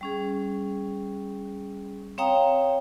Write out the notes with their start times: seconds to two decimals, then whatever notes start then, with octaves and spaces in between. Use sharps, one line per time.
0.01 G3 C#4 G#4
2.18 C4 C#5 F5 G5 A#5 D#6